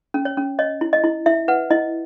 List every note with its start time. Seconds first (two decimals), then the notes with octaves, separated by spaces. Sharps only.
0.14 C#4
0.25 C#5
0.37 C#4
0.59 C#5 D#5
0.81 E4
0.93 D#5
1.04 E4
1.26 E4 E5
1.48 B4 F#5
1.70 E4 D#5